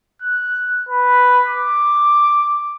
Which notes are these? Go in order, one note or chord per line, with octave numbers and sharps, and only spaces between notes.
F#6
B4
D6